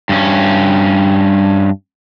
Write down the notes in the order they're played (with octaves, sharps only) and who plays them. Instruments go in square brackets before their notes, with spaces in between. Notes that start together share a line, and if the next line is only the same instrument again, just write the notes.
[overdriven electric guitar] G2 C#4